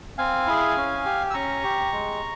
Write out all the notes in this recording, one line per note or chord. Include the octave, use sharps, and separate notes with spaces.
C4 F5 G#5
E4 G#4
C#4
G4
E6
C#4 A#5 C#6
G4
G#3